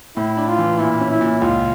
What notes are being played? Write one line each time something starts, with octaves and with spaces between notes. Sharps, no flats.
A2 E4
D4
F4
E3
A#2 E4
C#4
E4
A#2
C#2 F4